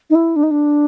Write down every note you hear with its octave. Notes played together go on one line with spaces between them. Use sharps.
D#4
E4
D4
D#4
D4